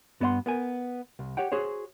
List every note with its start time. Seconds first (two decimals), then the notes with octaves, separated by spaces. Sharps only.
0.20 G2 B3 A4 D5 F#5 C6
0.46 B3 A#4 G#5
1.19 C2
1.37 G4 C#5 F#5 G5
1.52 F#4 G#4 C5 C#5